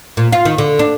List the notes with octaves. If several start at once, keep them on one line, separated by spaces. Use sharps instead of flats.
A#2
F4
D#3
D3
D4